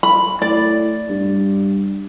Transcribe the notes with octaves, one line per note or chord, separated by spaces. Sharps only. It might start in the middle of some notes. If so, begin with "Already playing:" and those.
B5
A2 D5
G2